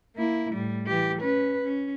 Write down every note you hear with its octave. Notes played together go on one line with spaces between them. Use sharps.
A#3 E4
A2 G3
E3 G4
C#4 B4
C#4